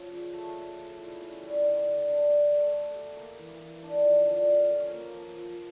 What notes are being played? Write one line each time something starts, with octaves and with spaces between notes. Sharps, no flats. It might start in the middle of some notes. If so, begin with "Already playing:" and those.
Already playing: F3 C#4
C#3
A3
A3
F3
E4
C#4
G3
D3
D3
D4
D4
A3
A3
G4
A#3
E3
E3
D4
F3
D3
F4
C#4
A#3
F3
F3